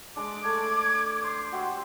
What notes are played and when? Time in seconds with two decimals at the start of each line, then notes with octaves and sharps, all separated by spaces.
0.16 G#3 D4 D6
0.44 A3 G#6
1.22 C5 C6
1.52 F#4 G4 E5